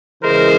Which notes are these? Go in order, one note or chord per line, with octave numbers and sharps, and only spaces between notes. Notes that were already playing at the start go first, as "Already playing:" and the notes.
C#3 E3 G#3 A#4 C5